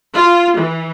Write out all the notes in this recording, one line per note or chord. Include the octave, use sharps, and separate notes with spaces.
F4
E3